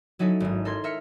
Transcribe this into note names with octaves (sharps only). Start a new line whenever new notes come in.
F#3 C#4 D#4 E4 A4
G#1 G#2
A4 A#4 C6 G#6
A#4 E5 F6 C#7